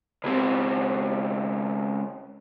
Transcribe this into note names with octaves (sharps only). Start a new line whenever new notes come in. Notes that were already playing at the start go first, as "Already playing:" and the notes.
C#2 C4